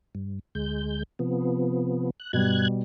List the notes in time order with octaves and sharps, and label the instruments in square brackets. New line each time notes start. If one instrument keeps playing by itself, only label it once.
[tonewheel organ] G2
D2 G#3 G6
C3 F3 B3
F#6
[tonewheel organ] G2 F#6 G#6 [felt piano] B2 G3